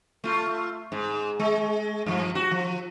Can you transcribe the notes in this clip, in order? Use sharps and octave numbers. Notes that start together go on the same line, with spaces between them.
A3 F4
G#2
G#3
G2 F3
F#4
F3